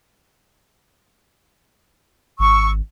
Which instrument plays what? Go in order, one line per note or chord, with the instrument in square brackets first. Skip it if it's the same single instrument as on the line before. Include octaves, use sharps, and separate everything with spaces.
[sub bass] G#1 [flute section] C#6 E6